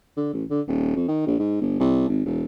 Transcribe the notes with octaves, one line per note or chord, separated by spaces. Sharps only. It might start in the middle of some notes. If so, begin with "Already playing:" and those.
D3
A1
D3
D#1
F2
D#3
A#1
G#2
G1
C2
G#1
E1